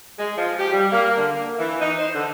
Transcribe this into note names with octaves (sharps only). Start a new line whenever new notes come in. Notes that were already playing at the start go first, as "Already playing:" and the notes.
G#3
F3
G4
G3
A#3
D3
A#3
E3
D#4
C5
D3